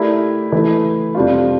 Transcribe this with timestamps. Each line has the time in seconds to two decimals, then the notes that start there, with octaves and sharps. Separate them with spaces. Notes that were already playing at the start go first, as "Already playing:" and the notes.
Already playing: A3 E4 G4 A#4 D5
0.52 E3 A3 E4
1.15 F2 C3 G3 D4 F4